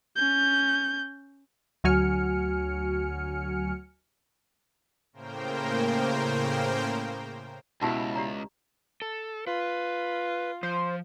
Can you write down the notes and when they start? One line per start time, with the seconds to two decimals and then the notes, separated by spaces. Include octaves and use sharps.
0.16 C#4 G6
1.84 D2 F#3 F#4 G#5 F6 C#7
5.13 A2 C#3 A#3 A#4 C5 G5
7.82 C#2 B2 E4 G4 E5 A5 B5
8.16 G4 D5 A#5
9.02 A4
9.47 F4 B4
10.63 F3 C5